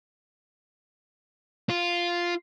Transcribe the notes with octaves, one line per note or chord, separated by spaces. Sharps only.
F4